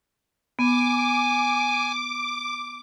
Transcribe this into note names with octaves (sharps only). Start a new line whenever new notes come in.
B3 G#5 D6